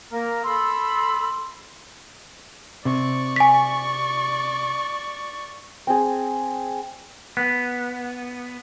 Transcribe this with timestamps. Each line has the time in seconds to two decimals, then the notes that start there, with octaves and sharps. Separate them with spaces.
0.12 A#3 A#4
0.44 A4 B5 C6 E6
2.85 C3 D5 C#6
3.36 G#5 B6
5.87 C4 G#4
7.37 B3